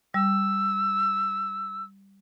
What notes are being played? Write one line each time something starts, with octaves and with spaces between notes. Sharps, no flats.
G3 E6